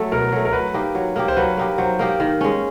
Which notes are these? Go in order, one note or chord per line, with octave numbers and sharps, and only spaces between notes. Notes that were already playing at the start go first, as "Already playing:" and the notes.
Already playing: F#3 A3 A4
B2 A#4
F#3 A3
A#4
F#3 B4
A#3 D#4 G4
F#3
A#3 D#4 G4
C5
F#3 B4
A#3 D#4 G4
F#3 C5
A#3 D#4 G4
D#3
G#3 C#4